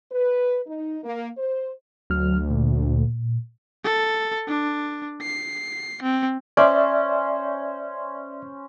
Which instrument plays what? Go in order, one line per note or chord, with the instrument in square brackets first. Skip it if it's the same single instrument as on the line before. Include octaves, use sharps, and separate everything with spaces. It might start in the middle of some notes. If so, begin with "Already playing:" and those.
[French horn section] B4
D#4
A#3
C5
[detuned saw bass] D2 [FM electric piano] F#3 F6
[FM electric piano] A#2
[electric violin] A4
D4
C7
C4
[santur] C#4 C5 [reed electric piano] D5 E5